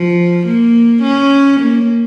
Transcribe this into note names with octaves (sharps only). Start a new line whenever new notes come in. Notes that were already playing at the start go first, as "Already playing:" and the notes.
Already playing: F3
A#3
C#4
A#3